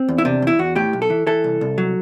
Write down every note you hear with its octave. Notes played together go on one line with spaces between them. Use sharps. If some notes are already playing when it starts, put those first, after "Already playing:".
Already playing: C4
E2
E4
C3 D4
E2 E4
E2 F#4
A2 G4
B1
A4
E3
E3 A4
C2
C2
F#3